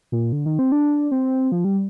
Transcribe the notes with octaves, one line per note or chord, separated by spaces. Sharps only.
A#2
D3
D#3
C4
D4
C4
F3
G3